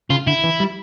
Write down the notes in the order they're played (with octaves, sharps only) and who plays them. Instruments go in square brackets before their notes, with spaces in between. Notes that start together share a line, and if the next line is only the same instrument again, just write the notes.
[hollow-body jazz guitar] C#3 [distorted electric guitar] F4
[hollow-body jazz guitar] D3 [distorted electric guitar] E4
[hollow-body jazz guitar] E3
G3